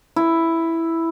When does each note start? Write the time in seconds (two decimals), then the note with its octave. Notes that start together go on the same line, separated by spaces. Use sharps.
0.16 E4